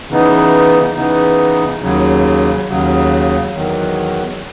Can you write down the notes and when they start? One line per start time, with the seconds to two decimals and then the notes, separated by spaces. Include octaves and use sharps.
0.09 C#3 E3 B3 D#4
0.96 C#3 E3 B3 D#4
1.82 D#2 C#3 F#3
2.68 D#2 C#3 F#3
3.54 E2 D#3 F#3